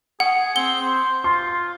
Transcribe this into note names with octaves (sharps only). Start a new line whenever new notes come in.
G#4 F#5
C4 G7
C5
F4 C6